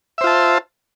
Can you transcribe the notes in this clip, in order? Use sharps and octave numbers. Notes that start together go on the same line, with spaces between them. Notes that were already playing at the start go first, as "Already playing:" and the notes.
F4 C5 E5 A5